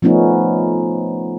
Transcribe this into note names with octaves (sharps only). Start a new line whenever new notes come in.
F3 A3 B3 C#4 D#4